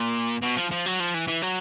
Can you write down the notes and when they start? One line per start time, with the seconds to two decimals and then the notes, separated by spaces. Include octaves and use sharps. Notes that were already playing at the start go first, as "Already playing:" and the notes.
Already playing: A#2
0.42 B2
0.57 F3
0.71 F3
0.86 F#3
1.00 F3
1.14 E3
1.28 E3
1.43 F#3